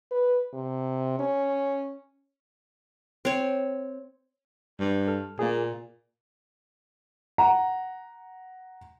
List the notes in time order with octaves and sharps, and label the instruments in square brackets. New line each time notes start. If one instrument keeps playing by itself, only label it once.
[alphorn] B4
C3
C#4
[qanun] C4 C#5
[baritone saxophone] G2
[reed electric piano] A4 F6
[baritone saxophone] A#2 [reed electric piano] A#3 G#4
[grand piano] F#5 A#5